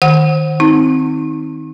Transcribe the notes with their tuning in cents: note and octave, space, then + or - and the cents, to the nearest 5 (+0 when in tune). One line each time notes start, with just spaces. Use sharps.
D#3 +0 F#5 +0
C4 +0 D#4 +25